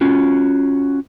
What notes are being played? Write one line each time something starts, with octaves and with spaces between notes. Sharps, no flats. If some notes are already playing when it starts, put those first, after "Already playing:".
C#4 F4 F#4